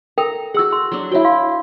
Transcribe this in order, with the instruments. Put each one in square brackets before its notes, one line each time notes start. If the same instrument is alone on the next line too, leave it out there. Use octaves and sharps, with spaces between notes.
[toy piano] A4 A#4 G5 [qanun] A#5
[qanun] F#4 F#5 [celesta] G#4 E6
[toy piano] C6
[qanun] F#3 D4
[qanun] E4 G5 [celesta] F#4 C#5 E5
[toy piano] F5 [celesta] C6